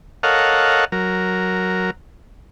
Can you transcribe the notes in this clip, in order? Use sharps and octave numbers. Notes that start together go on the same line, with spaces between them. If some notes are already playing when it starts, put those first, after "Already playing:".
A4 A#4 C#5 D#5 F5 F#5
F#3 A#4